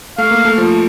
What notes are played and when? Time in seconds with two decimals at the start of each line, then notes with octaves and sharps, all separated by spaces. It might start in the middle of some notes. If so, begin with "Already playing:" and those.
0.18 A3 F5
0.31 A#3
0.45 A3
0.58 F3